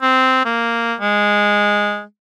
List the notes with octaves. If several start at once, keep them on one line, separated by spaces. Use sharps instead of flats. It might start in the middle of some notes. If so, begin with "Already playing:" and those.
C4
A#3
G#3